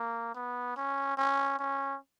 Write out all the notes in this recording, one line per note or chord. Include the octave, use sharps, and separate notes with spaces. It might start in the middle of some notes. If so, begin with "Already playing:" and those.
Already playing: A#3
B3
C#4
C#4
C#4